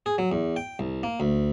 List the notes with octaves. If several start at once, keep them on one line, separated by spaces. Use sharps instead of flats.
G#4
F#3
E2
G5
C2
A#3
D2